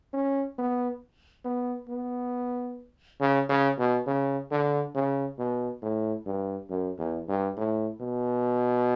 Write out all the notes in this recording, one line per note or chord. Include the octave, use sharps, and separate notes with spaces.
C#4
B3
B3
B3
C#3
C#3
B2
C#3
D3
C#3
B2
A2
G2
F#2
E2
G2
A2
B2